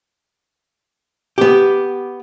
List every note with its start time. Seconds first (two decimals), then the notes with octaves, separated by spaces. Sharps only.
1.38 B3 G4